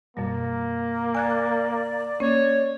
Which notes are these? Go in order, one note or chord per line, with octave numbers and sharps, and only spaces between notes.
F#2 B2 G3 A#3
D5 G#5 F#6 G#6
A#3 C#4 C#5